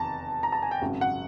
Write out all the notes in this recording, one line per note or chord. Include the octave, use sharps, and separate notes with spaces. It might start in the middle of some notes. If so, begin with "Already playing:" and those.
Already playing: F1 E2 D#3 A5 A#5
A#5
A5
G#5
G5
G#1 F#2 C#3 F#3
F#5